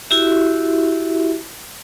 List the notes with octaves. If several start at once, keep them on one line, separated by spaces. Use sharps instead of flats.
E4 F#4 G4 E5